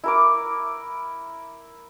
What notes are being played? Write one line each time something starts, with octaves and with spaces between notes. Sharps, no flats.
E4 A#4 D6